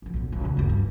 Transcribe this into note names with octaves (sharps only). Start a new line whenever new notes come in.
E3 F3
B1 A#2
D#1
C#2
G1 D#2
G2